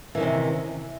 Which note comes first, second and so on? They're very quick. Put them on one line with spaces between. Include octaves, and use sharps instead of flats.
E3 D#3 C#4 C3